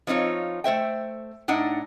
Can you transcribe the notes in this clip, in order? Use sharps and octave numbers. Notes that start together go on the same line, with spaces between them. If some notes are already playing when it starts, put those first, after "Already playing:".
F3 C4 D#4 F4 C#5
A3 C5 E5 G5
A2 D4 D#4 F#5